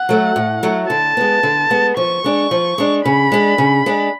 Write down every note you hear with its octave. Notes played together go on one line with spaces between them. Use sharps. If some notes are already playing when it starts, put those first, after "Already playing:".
Already playing: F#5
F#3 A3
A2
F#3 A3
D3 A5
G#3 B3
D3
G#3 B3
F3 C#6
G#3 D4
F3
G#3 D4
C#3 B5
G#3 D4
C#3
G#3 D4